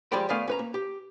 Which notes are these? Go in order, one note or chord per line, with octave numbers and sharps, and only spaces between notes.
F3 G3 G#3 D5 G5 B5
D#3 A3 B3 D5 F5 G#5
C#4 B4 A#5
A#3
G4